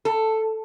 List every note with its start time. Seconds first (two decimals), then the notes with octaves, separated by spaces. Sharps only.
0.05 A4